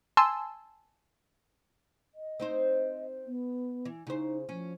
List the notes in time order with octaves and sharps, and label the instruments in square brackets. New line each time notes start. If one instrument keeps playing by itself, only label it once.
[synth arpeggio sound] G#5 A5 C6 E6
[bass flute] D#5
[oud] C4 D#4 C5
[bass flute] B3
[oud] E3
[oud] C#3 C5 [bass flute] D#4
[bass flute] F3 [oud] C#4